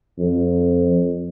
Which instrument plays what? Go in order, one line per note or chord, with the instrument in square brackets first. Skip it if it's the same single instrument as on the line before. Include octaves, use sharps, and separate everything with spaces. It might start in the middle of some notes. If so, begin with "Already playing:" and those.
[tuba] F2